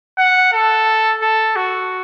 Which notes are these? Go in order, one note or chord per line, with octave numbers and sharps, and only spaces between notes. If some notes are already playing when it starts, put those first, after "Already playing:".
F#5
A4
A4
F#4